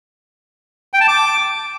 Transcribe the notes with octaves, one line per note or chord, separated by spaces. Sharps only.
G5
A5
D6